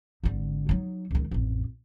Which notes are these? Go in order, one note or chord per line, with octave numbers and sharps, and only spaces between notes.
G#1 D3
F#3 D#4
C#2 D#3
A1 F2